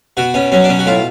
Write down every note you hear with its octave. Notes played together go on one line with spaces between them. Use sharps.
B2 F#4
B2 C#4
F#3 C#4
D4
B2 C#4
F#4
A2 F4